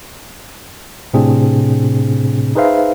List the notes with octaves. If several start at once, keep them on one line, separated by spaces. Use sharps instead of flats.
A2 C3 C4 D4 G#4
D#4 G#4 B4 C5 E5 F5